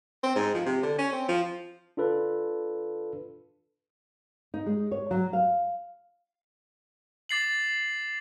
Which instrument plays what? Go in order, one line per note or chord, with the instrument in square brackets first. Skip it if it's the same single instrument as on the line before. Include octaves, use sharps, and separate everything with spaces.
[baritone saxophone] C4
G#2
F3
C3
D3
C#4
C4
F3
[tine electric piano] D4 F4 A4 B4
[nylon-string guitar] D#4
G#3
C#5
F#3
F5
[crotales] D6 A6 C7 F#7